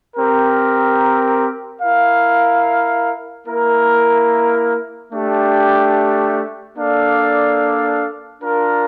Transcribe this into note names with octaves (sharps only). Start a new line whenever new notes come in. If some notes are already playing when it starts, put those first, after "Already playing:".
C4 G4 A#4
E4 A#4 F5
A#3 E4 A#4
A3 D4 G4
A#3 D4 A4 D5 F5
D4 F4 A#4